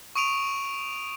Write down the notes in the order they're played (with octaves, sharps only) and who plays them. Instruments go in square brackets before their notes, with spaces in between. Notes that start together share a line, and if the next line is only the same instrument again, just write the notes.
[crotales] C#6 D#6 D7 D#7 F7